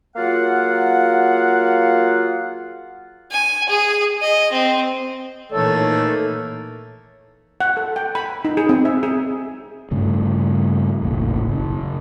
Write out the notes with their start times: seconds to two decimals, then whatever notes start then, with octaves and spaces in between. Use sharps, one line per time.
0.16 F#3 A#3 F4 G#4 F5 F#5
3.31 G#5
3.69 G#4
4.21 D#5
4.52 C4
5.52 A#2 D#3 E3 A3 A#3 A4 C#5
7.60 F#5
7.77 A4
7.96 G5
8.15 B5
8.45 D#4
8.57 G#4
8.69 C4
8.85 E5
9.03 G#4
9.91 G2 C#3 A3
11.02 E1 A1 A#2
11.47 F#1 C#3